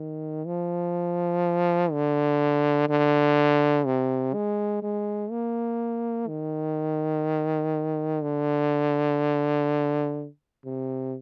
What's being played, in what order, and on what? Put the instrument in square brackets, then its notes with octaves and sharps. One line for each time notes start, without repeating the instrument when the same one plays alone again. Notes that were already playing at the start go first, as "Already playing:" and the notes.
Already playing: [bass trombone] D#3
F3
D3
D3
C3
G#3
G#3
A#3
D#3
D3
C3